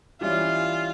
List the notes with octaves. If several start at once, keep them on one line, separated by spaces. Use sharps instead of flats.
E3 G3 C#4 E4 F4